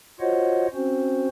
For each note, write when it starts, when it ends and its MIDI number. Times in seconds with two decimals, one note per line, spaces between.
0.20 0.67 65
0.20 0.67 66
0.20 0.67 72
0.20 0.67 73
0.20 0.67 75
0.20 0.67 78
0.74 1.28 60
0.74 1.28 61
0.74 1.28 66
0.74 1.28 72